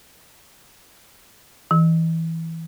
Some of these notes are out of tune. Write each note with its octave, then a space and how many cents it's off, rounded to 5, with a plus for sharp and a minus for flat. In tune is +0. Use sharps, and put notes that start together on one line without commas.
E3 -15